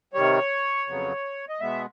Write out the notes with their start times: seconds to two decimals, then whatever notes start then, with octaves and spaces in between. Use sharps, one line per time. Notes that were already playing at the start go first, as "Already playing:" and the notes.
0.13 C3 D#3 G3 C#5
0.87 F2 C#3 F#3 B3
1.49 D#5
1.60 B2 G#3 B3 E5